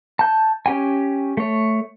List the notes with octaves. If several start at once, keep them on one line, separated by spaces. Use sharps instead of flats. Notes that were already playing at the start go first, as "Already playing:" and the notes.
A5 G6
C#4 G4 G5 G#5
A3 C#5